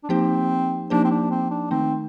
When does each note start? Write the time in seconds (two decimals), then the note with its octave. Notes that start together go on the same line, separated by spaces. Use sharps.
0.03 D4
0.09 F3 A#3 C4 D#4 G4 C5
0.90 F3 A#3 D4 D#4 G4 C5
1.04 C4
1.10 D4
1.30 C4
1.50 D4
1.71 D#3 A3 C4 D#4